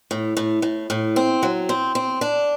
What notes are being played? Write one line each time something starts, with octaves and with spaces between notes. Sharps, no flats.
A2
A2
A2
A2
C4
F#3
C4
C4
D4